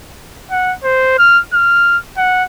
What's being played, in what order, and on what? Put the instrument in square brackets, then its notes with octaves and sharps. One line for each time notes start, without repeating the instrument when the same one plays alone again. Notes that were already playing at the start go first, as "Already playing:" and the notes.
[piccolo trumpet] F#5
C5
F6
F6
F#5